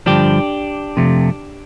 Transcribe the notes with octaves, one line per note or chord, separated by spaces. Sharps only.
G2 D3 F3 D4 G4
F2 C3 A3